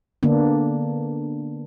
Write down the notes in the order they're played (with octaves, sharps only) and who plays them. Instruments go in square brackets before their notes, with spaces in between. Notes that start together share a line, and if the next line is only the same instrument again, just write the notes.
[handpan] D3 A#3 B3 D4